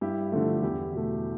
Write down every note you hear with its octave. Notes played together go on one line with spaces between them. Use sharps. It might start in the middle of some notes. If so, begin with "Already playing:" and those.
G2 E4 G4
D3 F3 A3
E2 E4 G4
B2 A3